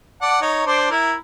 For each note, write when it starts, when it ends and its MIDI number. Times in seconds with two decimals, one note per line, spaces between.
0.22 0.39 74
0.22 0.39 78
0.22 0.39 81
0.42 0.63 63
0.42 0.63 73
0.66 0.89 62
0.66 0.89 72
0.66 0.89 74
0.91 1.14 64
0.91 1.14 70